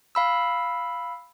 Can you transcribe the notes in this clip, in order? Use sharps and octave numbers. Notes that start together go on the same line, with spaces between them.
F5 B5 E6